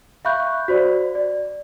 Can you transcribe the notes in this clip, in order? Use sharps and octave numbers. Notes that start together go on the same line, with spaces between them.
E5 F5 B5 C#6 F#6 G6
F#4 C5 D5
D5